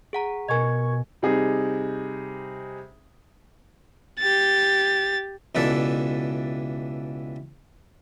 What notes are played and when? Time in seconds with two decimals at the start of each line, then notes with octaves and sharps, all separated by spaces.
0.13 G#4 F#5 A#5
0.48 B2 A#4 D#5 G#5 C#6 G#6
1.22 C3 G3 D#4 G#4
4.19 G4 A6
5.55 C#2 B2 E3 D4 A4 E5